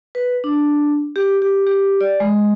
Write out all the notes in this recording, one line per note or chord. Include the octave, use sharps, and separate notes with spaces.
B4
D4
G4
G4
G4
D5
G#3